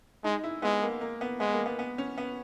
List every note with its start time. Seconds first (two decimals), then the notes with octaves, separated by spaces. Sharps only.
0.24 G#3 D#4
0.44 E4
0.62 G#3 B3
0.82 A#3
1.01 A#3
1.21 B3
1.40 G#3 B3
1.53 A#3
1.66 B3
1.79 B3
1.98 C#4
2.18 B3